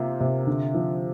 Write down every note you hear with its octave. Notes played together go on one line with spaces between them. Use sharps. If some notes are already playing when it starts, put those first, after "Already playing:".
Already playing: C3 A#3 F4
C3
D3
F3